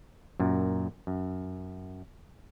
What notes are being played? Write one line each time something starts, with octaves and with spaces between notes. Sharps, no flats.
F#2 A#2
F#2